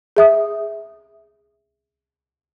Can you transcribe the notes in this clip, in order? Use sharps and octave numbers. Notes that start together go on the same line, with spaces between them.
G#4 E5 D#6